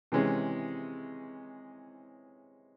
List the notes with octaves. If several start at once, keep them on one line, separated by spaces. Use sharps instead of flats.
C3 E3 G#3 C#4